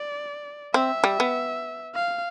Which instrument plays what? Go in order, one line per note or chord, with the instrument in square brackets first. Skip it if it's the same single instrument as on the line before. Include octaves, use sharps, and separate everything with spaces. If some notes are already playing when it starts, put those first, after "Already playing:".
Already playing: [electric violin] D5
[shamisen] C4 [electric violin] E5
[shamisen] G3
B3
[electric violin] F5